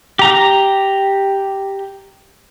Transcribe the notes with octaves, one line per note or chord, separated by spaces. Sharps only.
G4 A#5